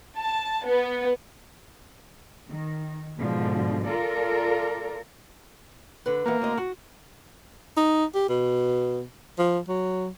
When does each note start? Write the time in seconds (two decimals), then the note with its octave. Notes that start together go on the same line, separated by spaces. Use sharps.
0.16 A5
0.65 B3
2.48 D#3
3.19 G#2 B2 D3 F3
3.87 F4 A4 A#4 D5
6.06 D3 B4
6.26 E3 A#3 B3 D#4
6.42 D2 C4 D#5
6.57 F#4
7.77 D#4
8.15 G4
8.29 B2
9.38 F3
9.69 F#3